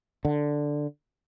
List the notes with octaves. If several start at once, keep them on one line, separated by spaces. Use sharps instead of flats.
D3